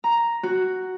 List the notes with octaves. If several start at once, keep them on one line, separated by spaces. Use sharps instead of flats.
A#5
F#4